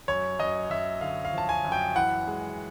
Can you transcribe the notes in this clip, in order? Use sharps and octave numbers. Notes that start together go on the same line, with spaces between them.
F#2 C#5
F#2 D#5
F#2 E5
D3 F5
F5
F3 A5
G#5
F#2
G5
E3 F#5
G#3